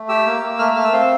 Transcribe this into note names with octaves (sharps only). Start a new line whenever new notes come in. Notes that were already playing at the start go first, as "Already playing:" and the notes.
Already playing: A3
G4 E6
A#3
A#3
A3 F6
E6
A3 F6
E6
C4 F5